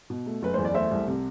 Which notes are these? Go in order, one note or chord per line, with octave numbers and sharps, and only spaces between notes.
B2
A3
F#1 B4
E2 C5
D5
A3 C5 E5
C2
C3